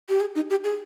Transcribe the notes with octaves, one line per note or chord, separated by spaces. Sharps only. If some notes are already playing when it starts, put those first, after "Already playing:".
G4
G#4
D#4
G4
G#4